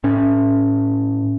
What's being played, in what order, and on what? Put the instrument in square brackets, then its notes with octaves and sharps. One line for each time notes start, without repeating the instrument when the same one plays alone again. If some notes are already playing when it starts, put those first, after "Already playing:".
[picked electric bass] A2 C#4